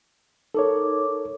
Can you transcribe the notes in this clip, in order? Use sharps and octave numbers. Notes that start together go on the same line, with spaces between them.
D#4 A4 A#4 C#5 D6